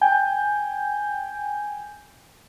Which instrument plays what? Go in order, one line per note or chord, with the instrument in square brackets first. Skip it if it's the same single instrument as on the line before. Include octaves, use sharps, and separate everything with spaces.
[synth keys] G5 G#5 G6